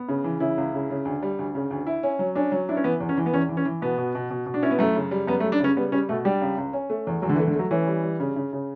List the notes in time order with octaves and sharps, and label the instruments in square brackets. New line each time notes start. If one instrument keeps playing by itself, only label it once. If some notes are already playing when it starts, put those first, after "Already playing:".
Already playing: [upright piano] B3
C#3
E3
[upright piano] C#3 [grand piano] E4
[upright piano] C#2
C#3
C#3
D2
G3
D2
C#3
D2
E4
C#4
F#3
[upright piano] C#4 [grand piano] D4
[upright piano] F#3
[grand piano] D4 [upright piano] E4
[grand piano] C#4
[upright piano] E3 [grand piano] B3
[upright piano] E2
[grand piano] C#4
[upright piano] E3
[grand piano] B3
[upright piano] E2 [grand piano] C#4
[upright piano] E3
[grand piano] C#4
[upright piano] E3
[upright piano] B2 [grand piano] B3
[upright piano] B2
B2
B2
B2
[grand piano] D4
[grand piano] C#4 [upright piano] E4
[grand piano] B3
[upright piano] F#2 [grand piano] A3
[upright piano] C#3
G3
[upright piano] F#2 [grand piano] B3
[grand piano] A3
[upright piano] G3
[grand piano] D4
[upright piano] C#3 [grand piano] C#4
[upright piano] G3 [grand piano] B3
[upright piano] G3 [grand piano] C#4
[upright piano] B2 [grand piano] A3
[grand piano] G3 [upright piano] D4
[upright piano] C#2
C#2
C#4
A3
E2
[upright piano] E2 [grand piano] F#3
[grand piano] D3
E3
[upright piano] A3
[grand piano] D3
[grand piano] F#3 [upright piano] A3
[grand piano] E3 [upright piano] C#4
[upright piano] G3
G3
C#3
C#3
C#3